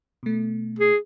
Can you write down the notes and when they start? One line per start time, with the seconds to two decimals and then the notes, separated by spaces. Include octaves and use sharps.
0.23 B2 A3
0.79 G#4